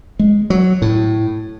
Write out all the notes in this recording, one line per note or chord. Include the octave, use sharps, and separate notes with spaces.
G#3
F#3
A2